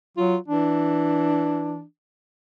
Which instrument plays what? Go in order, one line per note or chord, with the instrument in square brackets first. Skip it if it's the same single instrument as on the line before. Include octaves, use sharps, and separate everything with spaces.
[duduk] F#3 [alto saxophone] F4
[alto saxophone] E3 [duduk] D4